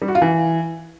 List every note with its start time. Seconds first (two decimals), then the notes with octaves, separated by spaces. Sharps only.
0.02 G3
0.08 F#4
0.15 F4
0.22 E3